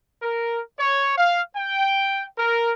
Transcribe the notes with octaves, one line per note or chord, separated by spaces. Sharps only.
A#4
C#5
F5
G5
A#4